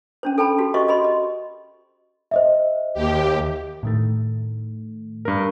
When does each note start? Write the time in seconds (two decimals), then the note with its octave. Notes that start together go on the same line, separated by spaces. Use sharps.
0.23 C#4 D4 C5
0.38 A4 G5 A5 B5
0.59 F#4 G4
0.74 F#4 C5 D#5 E5 C#6
0.88 D#5 B5 C6
1.04 D#5
2.31 C5 D#5 E5
2.94 D#2 G4
3.83 A2 D#3 A3
5.25 G2 A#4